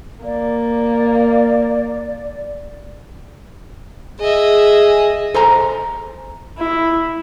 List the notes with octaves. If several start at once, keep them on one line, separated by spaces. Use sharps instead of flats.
A#3 D5
G#4 D#5 E5
A4 C5 G#5 A#5
E4